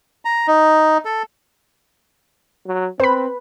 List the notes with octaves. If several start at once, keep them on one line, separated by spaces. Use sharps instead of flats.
A#5
D#4
A4
F#3
C4 B4 C5 B5